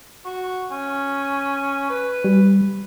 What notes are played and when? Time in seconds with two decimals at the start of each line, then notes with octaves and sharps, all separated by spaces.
0.25 F#4
0.71 C#4
1.90 B4
2.24 G3